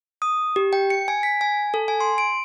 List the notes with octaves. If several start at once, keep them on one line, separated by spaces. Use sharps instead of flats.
D#6
G4
G5
C#7
G#5
B6
G#5
A4
G#5
C6
D7